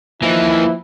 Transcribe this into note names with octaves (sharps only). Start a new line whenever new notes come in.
E3 F3 A#3 D#4 E4